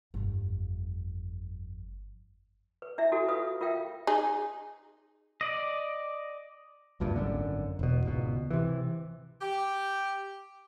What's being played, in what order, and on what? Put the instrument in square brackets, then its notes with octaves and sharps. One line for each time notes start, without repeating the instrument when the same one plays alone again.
[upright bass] G1 F2
[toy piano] B4
D4 E4 E5
D#4 E4 F#4 G4 A4
F4 B4 F5 D#6
F4 A#4 E5 F5 G5
[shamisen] D#4 G#4
[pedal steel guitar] D5 D#5
[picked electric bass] G#1 D2 G2 A#2
G#1 F#2 D3
E1 B2
G#1 C#2 B2
C3 E3
[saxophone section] G4